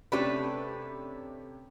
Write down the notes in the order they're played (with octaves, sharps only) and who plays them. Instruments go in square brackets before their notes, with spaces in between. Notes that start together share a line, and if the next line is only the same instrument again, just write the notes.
[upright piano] C3 C#4 G4 [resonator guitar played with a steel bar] A3 D4 B4